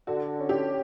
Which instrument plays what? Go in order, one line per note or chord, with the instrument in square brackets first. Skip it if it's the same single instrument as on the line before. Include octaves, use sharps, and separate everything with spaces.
[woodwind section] D3 [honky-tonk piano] F#4
[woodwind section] C#4
[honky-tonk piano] G4